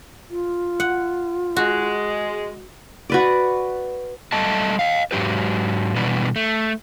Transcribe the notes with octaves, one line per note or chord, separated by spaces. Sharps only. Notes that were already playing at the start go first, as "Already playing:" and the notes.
F4
F#5
G#3 F#4
F#4 B4 D5
G3 A3 A4 D#5 A5
D#5 F5
G#2 F#3 G4 B4
B2 E3 G3 D4 B4
A3